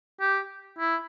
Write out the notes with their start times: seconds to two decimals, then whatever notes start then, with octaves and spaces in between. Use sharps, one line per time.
0.21 G4
0.78 E4